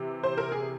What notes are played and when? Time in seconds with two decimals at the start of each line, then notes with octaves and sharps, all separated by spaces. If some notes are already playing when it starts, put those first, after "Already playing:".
Already playing: C3 E3
0.23 C5
0.38 A#4
0.52 G#4